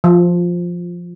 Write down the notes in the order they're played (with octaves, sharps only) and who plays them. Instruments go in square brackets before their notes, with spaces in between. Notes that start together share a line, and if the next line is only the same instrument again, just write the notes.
[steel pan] F3